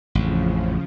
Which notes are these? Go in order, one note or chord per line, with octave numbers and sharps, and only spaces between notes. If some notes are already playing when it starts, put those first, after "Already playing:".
A1 F2 C#3 F3